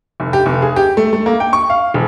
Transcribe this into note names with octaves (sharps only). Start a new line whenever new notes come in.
F1
G4
F1
G#4
G4
A3
A3
A#3
G5
C#6
F5
E1